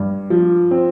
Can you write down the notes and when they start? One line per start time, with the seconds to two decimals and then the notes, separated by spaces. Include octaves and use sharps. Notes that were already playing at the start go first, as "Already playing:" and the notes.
Already playing: G2
0.30 F3
0.71 C4